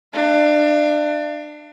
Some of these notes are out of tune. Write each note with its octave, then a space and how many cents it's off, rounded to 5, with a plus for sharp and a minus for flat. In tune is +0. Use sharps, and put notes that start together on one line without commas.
D4 +25 F5 -40